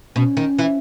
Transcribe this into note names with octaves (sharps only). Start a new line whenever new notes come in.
B2 C#4
D#3
E3